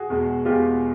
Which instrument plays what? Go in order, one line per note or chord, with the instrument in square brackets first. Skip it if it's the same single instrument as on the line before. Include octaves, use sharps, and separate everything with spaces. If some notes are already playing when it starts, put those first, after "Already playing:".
Already playing: [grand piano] F#4 G#4
E2 B2 G#3
E2 B2 G#3 F4 G4